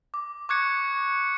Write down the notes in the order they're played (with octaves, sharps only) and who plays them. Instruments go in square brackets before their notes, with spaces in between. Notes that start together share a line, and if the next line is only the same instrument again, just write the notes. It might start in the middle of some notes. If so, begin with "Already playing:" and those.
[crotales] D6
C#6 D6 F#6 G#6 C#7